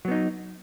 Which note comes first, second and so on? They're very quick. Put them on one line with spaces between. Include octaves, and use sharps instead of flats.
F#3 B3 D#4